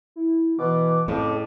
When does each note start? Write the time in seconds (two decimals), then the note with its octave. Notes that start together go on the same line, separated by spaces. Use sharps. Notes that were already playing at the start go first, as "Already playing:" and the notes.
0.16 E4
0.59 B2 E3 D6
1.08 F2 A2 C#3 C4 D6